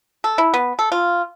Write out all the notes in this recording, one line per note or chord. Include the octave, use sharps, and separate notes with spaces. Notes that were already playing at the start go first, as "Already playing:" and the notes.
A4
E4
B3
A4
F4